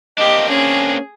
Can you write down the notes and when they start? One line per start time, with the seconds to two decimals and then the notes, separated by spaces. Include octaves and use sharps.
0.18 A#3 C4 D4 G4 D#5
0.49 C#4 G#4